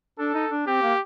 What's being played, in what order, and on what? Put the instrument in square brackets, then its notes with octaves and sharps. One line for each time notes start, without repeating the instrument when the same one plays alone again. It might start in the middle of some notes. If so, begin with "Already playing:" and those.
[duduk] D4 [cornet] A4
[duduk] D#4
D4
[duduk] C4 [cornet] G4
[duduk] A#3